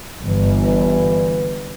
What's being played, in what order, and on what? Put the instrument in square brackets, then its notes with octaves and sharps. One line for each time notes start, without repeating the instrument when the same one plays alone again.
[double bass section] G1 [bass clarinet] E3